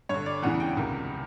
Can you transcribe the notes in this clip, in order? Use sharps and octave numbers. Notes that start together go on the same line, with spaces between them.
G2 D3 C#5
D5
E2 C#3 E3 F#5
G5
C#2 C3 D#3